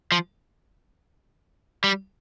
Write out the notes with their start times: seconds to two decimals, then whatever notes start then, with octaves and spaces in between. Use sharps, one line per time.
0.12 F3
1.84 G3